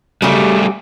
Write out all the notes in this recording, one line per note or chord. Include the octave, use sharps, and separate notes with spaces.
C#3 F#3 G3 A3 G4